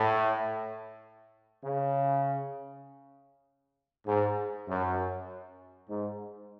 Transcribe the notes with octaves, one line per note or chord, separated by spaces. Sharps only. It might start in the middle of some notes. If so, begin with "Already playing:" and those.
Already playing: A2
C#3
G#2
F#2
G#2